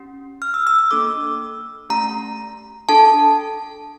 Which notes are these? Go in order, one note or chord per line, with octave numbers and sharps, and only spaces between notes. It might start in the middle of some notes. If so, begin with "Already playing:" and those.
Already playing: C#4 G4
F6
E6
E6
E6
A#3 D4 A4 D6
A3 C#4 G4 A#5
D4 A4 A5